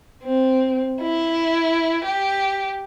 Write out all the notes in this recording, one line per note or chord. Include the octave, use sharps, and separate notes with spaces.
C4
E4
G4